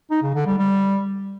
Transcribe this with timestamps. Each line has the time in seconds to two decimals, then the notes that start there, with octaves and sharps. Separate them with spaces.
0.11 D#4
0.23 C#3
0.35 D3
0.47 G3
0.59 G3